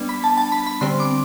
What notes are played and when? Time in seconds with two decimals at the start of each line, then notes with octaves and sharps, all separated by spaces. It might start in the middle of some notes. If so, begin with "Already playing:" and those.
Already playing: G3 B3 D4
0.09 B5
0.24 A5
0.38 A5
0.52 B5
0.67 B5
0.81 D3 G3 C4 C6
1.00 D6